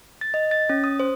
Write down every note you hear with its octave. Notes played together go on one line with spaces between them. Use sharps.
A6
D#5
A6
C#4
D#6
C5